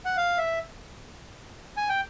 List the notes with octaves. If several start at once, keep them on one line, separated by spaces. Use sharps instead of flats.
F#5
F5
E5
G#5
G5